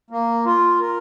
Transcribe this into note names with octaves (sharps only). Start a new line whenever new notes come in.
A#3
F4
A#4